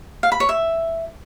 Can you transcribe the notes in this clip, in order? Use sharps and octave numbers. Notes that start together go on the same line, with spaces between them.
F5
B5
C#5
E5